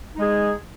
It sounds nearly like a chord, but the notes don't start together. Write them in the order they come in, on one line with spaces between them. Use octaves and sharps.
D#4 G#3 G#4